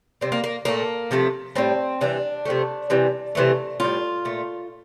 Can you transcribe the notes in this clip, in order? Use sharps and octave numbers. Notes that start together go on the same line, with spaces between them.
C3 G3 C4
A#3
A#3
A#2 A3 A#3
C3 F3 A3
A2 G3 C4
C3 E3 G3 D4
C3 F3 A3
C3 E3 G3
C3 E3 A3
A2 G3 F4
A#2 A3